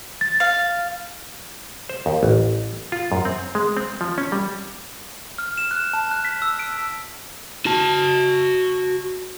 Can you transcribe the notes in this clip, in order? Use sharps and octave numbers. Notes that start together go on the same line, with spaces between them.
A6
F5
C5
D#2
A1
F4
F#2
C4
G#3
C4
F3
C#4
G3
F6
E7
F#6
A5
F#6
B6
E6
D7
F#4 A5